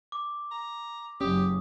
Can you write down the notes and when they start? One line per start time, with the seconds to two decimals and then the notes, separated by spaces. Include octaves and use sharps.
0.12 D6
0.51 A#5
1.21 F#1 F#3 C#4 G4 D#6